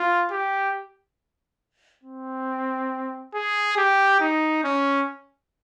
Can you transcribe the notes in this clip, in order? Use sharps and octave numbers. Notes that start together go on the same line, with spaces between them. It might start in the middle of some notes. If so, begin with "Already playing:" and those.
Already playing: F4
G4
C4
G#4
G4
D#4
C#4